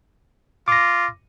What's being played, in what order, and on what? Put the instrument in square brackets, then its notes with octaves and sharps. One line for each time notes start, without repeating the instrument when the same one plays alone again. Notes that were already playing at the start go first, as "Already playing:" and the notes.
[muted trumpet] F4 [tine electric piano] D6 A#6